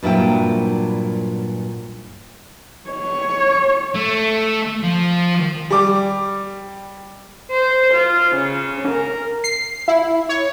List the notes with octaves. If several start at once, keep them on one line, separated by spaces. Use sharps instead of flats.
G2 A#2 F#3 E4 C5 G5
C#5
A3
F3
G3 D6
C5
F4
C#3
A#4
C7
E4
C#5